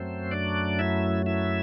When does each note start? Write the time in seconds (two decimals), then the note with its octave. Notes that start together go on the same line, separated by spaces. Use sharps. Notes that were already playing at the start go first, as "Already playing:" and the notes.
Already playing: F#2 F#3 A3 C4 C5
0.31 D4 D5
0.79 E4 E5
1.26 E4 E5